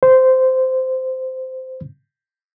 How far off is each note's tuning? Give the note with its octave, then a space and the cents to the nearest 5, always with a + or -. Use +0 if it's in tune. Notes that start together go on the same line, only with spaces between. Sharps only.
C5 -10